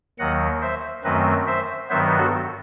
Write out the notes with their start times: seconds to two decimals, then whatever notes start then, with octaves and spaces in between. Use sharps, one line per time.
0.19 D#2 D#3 F#3 D#5 F#5
0.61 C5 E5
1.04 F#2 D#3 F#3 A3 C4 B4 D#5
1.47 C5 E5
1.89 G2 D#3 F#3 B3 C5 E5
2.17 F#4 A4